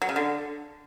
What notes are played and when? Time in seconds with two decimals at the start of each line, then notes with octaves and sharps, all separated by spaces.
0.02 F#3
0.09 C#3
0.16 D3